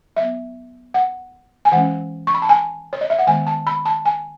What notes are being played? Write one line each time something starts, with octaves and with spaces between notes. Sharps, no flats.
F#3 B3 E5
F#5
G#5
E3 G#3 C#4 F#5
C#6
B5
A5
G#5
C#5
D#5
E5
F#5
D#3 G#3 B3 G#5
A5
B5
A5
G#5